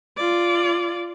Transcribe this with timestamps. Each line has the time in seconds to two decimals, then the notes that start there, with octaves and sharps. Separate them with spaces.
0.17 F4 D5